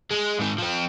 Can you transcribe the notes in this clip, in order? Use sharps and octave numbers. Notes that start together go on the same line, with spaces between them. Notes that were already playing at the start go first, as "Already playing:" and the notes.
G#3
G#2 D#3
F3 C4